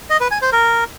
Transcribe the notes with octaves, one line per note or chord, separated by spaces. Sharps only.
D#5
B4
G#5
C5
A#4